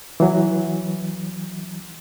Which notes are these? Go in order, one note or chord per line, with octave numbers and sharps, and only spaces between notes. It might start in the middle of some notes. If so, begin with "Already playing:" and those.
E3 F#3